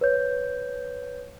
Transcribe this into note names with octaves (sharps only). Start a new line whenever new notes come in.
B4 C#5 G6